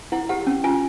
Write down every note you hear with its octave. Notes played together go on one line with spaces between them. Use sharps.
E4 F#5
G4 F#5
C#4
F4 G#5